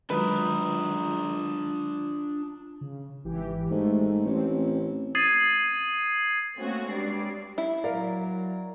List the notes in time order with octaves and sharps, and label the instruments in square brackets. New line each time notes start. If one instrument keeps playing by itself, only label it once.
[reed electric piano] D#3 F#3 G#3 [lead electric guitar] D4 A#4 [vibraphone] F4 D#6 [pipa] B4
[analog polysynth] C#3
G#1 E3 G4
[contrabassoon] G#2 [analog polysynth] A3
[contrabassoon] A1 [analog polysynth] C4
[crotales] D#6 G#6 A6 C7 D#7
[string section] A3 A#3 C4 C#4 F#4
G2 G#3 D5 C7
[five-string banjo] E4
[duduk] F#3 [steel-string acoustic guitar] A#4 [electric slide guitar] D5 F5